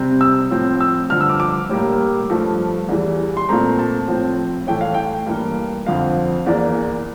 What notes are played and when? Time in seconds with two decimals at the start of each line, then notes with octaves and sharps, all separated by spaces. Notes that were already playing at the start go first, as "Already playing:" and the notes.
Already playing: C3 G3 C4
0.21 E6
0.51 A2 F3 C4
0.80 E6
1.10 G2 D3 F3 F6
1.21 E6
1.29 D6
1.40 D6
1.70 A2 G3 A#3
2.30 G2 F3 A3
2.89 E2 E3 G3
3.37 C6
3.49 A#2 A3 C4 A#5
3.79 A5
4.08 A2 F3 C4
4.67 A2 E3 A3 G5
4.81 F5
4.94 G5
5.27 G2 E3 A#3
5.86 F2 D3 F3 C4 F5
6.46 E2 E3 A#3 D5